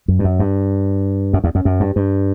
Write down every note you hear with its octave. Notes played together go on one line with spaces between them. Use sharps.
F#2
G2
F#2
G2
F#2
E2
F#2
F#2
G2
G2